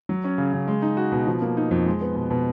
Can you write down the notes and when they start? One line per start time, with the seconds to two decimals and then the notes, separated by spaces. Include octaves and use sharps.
0.09 F#3
0.24 C#4
0.38 C#3
0.53 C#3
0.68 G#3
0.82 D#4
0.97 F#4
1.12 B2
1.27 F3
1.42 A#3
1.57 D#4
1.71 F2
1.86 G#3
2.01 B3
2.15 B2
2.30 B2